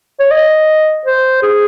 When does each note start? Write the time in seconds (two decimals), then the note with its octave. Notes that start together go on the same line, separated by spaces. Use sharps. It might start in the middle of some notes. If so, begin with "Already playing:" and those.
0.20 C#5
0.31 D#5
1.05 C5
1.43 G#4